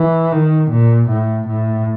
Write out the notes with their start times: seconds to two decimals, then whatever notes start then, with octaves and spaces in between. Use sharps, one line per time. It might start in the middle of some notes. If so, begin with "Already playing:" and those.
Already playing: E3
0.32 D#3
0.71 A#2
1.10 A2
1.48 A2